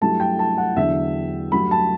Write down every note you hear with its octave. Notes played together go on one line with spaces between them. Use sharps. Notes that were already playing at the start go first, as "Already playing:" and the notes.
G2 F#3 A3 E4 A5
G5
A5
F#5
E2 D3 F#3 E5
G2 F#3 A3 B5
A5